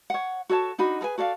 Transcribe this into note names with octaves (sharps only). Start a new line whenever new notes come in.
C#5 F#5
F#4 A4 C#5 A5
D4 D#4 F#4 B5
G#4 A4 B4 G#5
F#4 A4 D5 F5